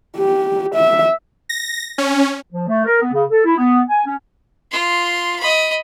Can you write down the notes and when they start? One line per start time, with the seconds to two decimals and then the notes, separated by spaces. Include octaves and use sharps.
0.17 G4
0.74 E5
1.49 A#6
1.98 C#4
2.52 F3
2.68 A3
2.85 A#4
3.01 B3
3.13 C#3
3.30 A4
3.45 E4
3.57 B3
3.89 G#5
4.06 C#4
4.71 F4 C6
5.40 D#5 B5